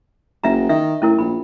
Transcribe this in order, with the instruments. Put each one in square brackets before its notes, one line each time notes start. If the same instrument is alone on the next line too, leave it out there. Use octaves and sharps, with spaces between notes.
[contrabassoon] F#1 [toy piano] E5 A#5
[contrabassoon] D#3 [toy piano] E5
[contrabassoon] A2 [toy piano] C#4 E4 A#4
[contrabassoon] A#1 [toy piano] B5